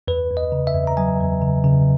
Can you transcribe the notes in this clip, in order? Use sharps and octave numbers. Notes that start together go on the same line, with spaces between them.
E2 B4
E2
D#5
C#3
E5
E2
A#5
F#3 G#5
E2
C#3
C#3